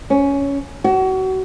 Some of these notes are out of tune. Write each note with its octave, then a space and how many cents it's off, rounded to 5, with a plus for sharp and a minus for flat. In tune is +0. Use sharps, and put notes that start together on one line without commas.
C#4 +10
F#4 +30